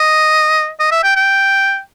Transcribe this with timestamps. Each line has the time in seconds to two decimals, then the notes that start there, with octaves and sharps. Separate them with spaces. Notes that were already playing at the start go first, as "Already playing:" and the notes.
Already playing: D#5
0.80 D#5
0.91 E5
1.04 G5
1.16 G5